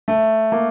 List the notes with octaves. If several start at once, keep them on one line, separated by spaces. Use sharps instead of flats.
A3
A#3